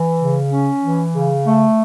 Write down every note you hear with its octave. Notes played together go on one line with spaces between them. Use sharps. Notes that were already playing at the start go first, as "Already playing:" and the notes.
Already playing: E3
C#3
C#4
E3
C#3
A3